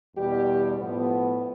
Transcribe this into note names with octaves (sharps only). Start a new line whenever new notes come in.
E2 B2 G3 B3 G4
A2 F3 B3